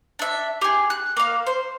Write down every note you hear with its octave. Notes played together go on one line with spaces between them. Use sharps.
D4 E5
G4 G#4
F#6
A#3 F5
C5